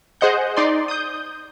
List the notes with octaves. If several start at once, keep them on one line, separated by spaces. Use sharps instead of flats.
G#4 C5 D#5 F#5 G6
D#4 D5 C6
D#6 G6